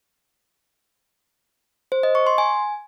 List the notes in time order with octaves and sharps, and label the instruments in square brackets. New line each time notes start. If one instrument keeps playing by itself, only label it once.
[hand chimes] C5
D#5
C#6
C6
G#5